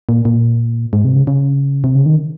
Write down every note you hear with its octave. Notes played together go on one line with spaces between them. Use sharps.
A#2
A#2
G#2
C3
C#3
C#3
C3
C#3
D#3